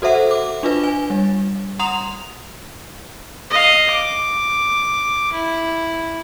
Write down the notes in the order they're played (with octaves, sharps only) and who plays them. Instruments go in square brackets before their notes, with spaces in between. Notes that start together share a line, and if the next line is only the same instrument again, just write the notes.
[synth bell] F#4 A4 C5 E5 F#5
D6
D4 F4 B4
G#5
G3
F#5 A#5 C6 D#6 F7
[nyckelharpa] D#5 F5
D6
E4